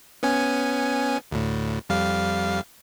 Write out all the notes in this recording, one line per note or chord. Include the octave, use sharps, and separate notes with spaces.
B3 C#4 G#5
D2 A2
F2 G3 F5